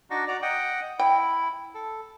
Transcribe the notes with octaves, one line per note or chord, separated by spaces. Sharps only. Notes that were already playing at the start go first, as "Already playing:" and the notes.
D4 D#4 F#4
F#4 D5 A#5
D#5 F#5 G5
E4 G5
A4